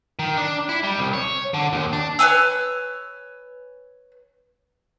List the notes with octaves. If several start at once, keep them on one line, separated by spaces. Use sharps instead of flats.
D#3
D4
E4
G3
C2
C#5
D3
D#2
D4
B4 C#5 G#5 E6